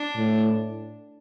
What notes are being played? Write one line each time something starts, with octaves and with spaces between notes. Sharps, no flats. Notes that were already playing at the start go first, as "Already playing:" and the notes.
Already playing: D4
A2